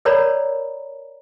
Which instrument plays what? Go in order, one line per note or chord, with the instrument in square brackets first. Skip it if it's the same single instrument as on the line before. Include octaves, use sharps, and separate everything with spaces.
[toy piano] A4 A#4 C#5 D5 A#5 B5